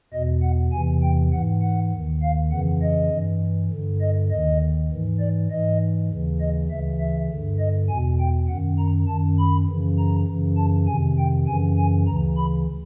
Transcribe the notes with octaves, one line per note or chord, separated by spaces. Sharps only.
E2 B2 D#5
F#5
E2 C3 E3 G#5
G5
G#2 E3 F#5
F#5
D#2 D#3
F5
F2 C#3 E3 F#5
D#5
G2 E3
G2 D3
D#5
D#2 D#3 D#5
G#2 E3
D5
G#2 E3 D#5
D#2 C#3 E3
D#5
D2 C#3 E3 E5
E5
G2 D3
D#5
E2 B2 G#5
G5
F#2 F#5
D#3
A#5
F#2 D#3 A5
B5
F#2 C#3 E3
A#5
F#2 C#3 E3
A5
F2 C3 D#3 G#5
G5
F#2 C#3 E3 G#5
G#5
D2 C#3 E3 A#5
B5